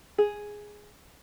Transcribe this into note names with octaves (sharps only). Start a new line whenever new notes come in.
G#4